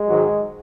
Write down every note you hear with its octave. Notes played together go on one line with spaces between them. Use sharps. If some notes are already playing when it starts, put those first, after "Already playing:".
Already playing: G#3
G#2 D#3 F#3